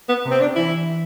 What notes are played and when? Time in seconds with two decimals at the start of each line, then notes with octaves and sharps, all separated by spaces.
0.09 B3
0.25 C3
0.31 C4
0.40 D4
0.56 E3 E4